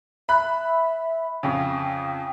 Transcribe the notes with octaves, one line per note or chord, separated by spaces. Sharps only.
E5 B5 F#6
F2 C#3 G5